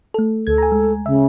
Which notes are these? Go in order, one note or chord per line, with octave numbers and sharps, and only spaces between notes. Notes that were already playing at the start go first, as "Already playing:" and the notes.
A3 A4
D2 A4 G#6
G#5 A#5
G#3
C#3 E5